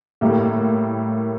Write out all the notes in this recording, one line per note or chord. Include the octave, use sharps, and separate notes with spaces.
A2 G3 A#3